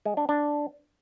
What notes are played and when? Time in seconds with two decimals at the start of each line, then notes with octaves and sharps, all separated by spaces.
0.05 G#3
0.17 D4
0.29 D4